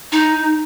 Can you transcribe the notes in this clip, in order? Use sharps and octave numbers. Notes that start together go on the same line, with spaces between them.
D#4